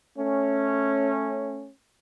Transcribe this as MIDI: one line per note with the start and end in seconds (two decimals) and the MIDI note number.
0.18 1.70 57
0.18 1.70 61